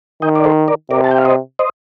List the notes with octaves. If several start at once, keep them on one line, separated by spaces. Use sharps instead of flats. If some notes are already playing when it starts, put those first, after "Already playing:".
D#3 D#5 G5
D5
A4 C5
A#4 D5
C3 A#4 D5
A5
G5
F5
C5 D#5
C5 D#5